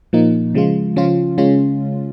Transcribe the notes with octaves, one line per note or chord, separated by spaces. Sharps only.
A#2 F3 A#3 D#4
C#3 F3 G#3 F4
C#3 F3 C#4 F4
C#3 G#3 C#4 F4